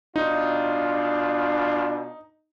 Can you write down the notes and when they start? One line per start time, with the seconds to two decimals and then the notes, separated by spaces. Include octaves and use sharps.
0.16 B2 D4 D#4 F4